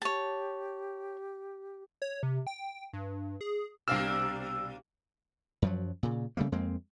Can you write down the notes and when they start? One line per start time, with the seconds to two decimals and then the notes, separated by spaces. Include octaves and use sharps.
0.02 G4 C#5 A5
2.02 C#5
2.23 C3
2.47 G5
2.93 G2
3.41 G#4
3.88 C2 B2 A#3 D4 F5 E6 F6
5.62 F#2 F3 F#3
6.03 A#2 C#3
6.37 C#3 G3 A3 A#3
6.52 F2 G#3 A#3 C4